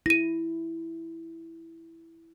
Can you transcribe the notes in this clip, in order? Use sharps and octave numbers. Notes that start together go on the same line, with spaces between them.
E4 A#6 D#7